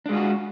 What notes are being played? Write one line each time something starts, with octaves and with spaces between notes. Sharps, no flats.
G#3 D4 F4 F#4